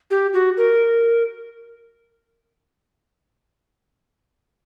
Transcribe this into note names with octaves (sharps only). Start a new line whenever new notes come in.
G4
F#4
A#4